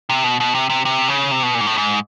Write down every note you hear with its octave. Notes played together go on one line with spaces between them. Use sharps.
C3
B2
B2
C3
C3
C3
C#3
C3
B2
A#2
G#2
A2
G#2